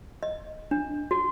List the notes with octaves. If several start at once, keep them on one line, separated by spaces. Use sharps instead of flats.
D#5
D4
F#4